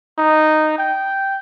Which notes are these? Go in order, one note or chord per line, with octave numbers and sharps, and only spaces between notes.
D#4
G5